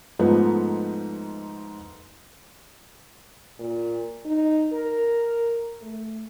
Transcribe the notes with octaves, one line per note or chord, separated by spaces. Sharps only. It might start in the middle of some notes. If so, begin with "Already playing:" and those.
G#2 F3 A3 B3 D#4
A#2
D#4
A#4
A3